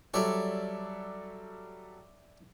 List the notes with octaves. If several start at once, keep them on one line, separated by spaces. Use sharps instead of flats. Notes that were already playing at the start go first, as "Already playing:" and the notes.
F#3 G3 A4 C#5 D5 E5